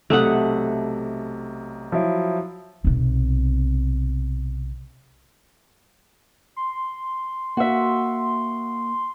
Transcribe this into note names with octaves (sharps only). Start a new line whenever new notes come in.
B1 C3 A3 F#5 D#6
F3 F#3 E4
B1 C3
C6
A#3 F#4 E5